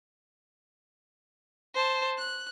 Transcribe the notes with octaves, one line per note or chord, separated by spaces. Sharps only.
C5 A5
F#6